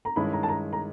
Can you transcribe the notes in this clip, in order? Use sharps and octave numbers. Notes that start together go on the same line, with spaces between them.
A#5
G2 D#3 G#3 C#4 E4 B5
A#5
A5
A#5
A#5